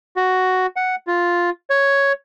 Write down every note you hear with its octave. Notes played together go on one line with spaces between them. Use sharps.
F#4
F#5
F4
C#5